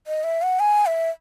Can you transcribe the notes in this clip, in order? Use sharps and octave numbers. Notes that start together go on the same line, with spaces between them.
D#5
E5
F#5
G#5
E5